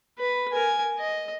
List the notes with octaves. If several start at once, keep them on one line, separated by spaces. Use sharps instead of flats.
B4
A#4 G#5
D#5